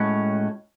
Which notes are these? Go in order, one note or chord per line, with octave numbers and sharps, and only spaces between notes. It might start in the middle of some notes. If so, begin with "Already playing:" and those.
Already playing: A2 G#3 C#4 F#4